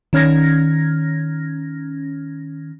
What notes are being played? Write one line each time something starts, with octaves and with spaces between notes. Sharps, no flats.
D#3 C#4 F6 G#6 A#6